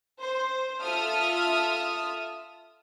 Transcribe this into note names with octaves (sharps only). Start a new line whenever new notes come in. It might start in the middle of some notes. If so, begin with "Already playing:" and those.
C5
F4 A4 E5 D#6 F6